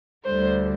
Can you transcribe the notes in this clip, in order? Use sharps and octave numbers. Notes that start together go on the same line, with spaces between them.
D2 D3 G3 C5